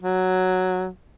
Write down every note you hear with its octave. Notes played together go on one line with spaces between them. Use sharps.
F#3